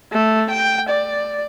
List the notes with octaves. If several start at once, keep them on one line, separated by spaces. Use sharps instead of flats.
A3
G5
D5